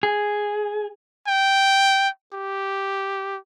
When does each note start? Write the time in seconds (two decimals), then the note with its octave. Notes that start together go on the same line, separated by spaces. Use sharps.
0.03 G#4
1.27 G5
2.33 G4